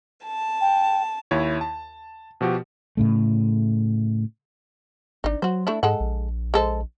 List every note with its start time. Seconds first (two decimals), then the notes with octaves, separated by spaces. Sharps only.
0.25 A5
0.61 G5
1.31 D#2 E4 C#5
1.61 A5
2.41 B2 F3 F#4 G4
2.97 A2 C#3 A3
5.24 G#1 D4 D#4
5.42 F#3 F#4 C5
5.67 A3 D4 E4
5.83 G#2 G#3 A4 F#5
6.00 A#1
6.54 G#3 A4 C5